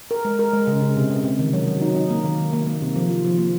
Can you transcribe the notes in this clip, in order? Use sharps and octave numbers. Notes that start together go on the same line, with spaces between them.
A#4
G#3
A#4
G#3
C#3
C#3
C3
C3
C3
D#3
F#3
F#3
D#4
D#4
A#3
D#3
D#3
A#3
A#3
C3
F3
F4
F3
A#3